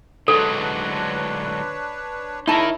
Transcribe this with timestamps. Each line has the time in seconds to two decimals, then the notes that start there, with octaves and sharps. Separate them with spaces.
0.28 D3 F#3 G#3 D4 A4 B4 C#5
2.48 C#3 D#4 E4 A#4 C#5 A5